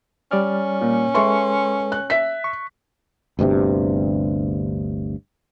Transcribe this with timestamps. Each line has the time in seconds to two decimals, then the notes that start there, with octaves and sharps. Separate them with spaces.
0.31 G3 C#4 D5 F6
0.81 A#2
1.14 G#3 A4 B4 E5 C6 C#6
1.92 F#6
2.10 E5 B6
2.44 C#6
3.39 G1 D2 G2 C3